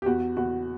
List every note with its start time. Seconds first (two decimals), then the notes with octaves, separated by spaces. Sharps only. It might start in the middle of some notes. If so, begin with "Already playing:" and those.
0.02 G4
0.06 E2 F#4
0.37 E2 F#4